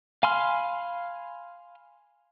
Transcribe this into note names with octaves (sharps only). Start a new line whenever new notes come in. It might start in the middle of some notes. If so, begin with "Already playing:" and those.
F5 G#5 B5 C6 F6